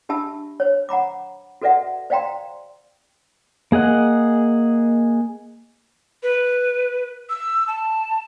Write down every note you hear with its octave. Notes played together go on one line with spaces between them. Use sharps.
D4 G4 E5 A5 B5 E6
C5 C#5
F#5 A#5 B5 D6
F#4 A4 B4 D5 E5 F#5
C5 D5 F5 G5 A#5 C6
A#3 G#4 D#5 F#5
B4
E6
A5